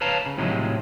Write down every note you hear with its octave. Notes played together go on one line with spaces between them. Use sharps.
B4 C#5 F5 A5 A#5
C#3
A2 C3 D#3 F3 F#3 G#3